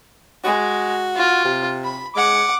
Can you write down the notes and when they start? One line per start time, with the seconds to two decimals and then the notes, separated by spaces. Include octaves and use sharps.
0.44 G#3 F#4
1.16 F4
1.45 C3
1.84 B5
2.16 G#3 F#5 D6